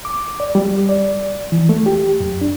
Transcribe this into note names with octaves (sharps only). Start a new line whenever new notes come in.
D6
D5
G3
D5
E3
A3
G4
F#2
D4